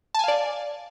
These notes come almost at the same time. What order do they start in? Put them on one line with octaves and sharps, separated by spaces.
A5 G#5 F5 D5